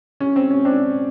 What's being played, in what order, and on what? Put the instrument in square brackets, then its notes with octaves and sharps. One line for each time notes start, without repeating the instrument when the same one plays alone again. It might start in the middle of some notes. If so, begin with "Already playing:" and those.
[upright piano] C#4
C4
C#4
C4 D4